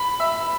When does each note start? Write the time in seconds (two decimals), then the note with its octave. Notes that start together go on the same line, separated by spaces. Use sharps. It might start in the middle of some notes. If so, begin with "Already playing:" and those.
Already playing: B5
0.20 E5